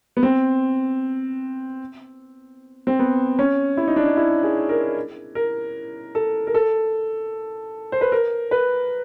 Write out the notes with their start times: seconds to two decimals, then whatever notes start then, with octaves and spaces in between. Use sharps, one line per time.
0.17 B3
0.23 C4
2.87 C4
2.99 B3
3.39 C#4
3.77 E4
3.87 D#4
3.96 D4
4.06 D#4
4.17 E4
4.43 G#4
4.69 A#4
5.35 A#4
6.15 A4
6.47 A#4
6.54 A4
7.92 C5
8.01 B4
8.12 A#4
8.51 B4